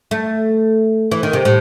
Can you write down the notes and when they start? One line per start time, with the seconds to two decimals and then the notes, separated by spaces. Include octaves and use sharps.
0.11 A3
1.11 E3
1.23 D#3
1.33 C3
1.45 A2